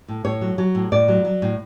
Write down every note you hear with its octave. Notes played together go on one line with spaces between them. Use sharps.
A2
A2 C#5
F#3
F#3
A2
A2 D5
F#3
F#3
A2